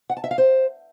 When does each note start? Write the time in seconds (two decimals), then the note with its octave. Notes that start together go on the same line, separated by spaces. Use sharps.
0.10 F#5
0.17 A5
0.24 E5
0.31 F5
0.38 C5